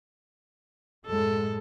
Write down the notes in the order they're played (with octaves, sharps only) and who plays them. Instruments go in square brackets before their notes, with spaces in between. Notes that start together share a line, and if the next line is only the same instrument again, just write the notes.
[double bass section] F#2 A2 G#3 [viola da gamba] A4